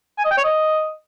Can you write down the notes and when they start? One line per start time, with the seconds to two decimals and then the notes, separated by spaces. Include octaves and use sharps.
0.18 G#5
0.25 D#5
0.31 G5
0.37 C#5
0.44 D#5